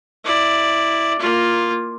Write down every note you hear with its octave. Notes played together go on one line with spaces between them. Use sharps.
E4 D5
A#3 F4